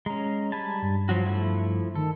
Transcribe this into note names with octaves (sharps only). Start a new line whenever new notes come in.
G#3 C#4 A#5
G3 G#5 A5 B5
G2
F3 F#3 F#4
F3 A3 E4
D#3 A4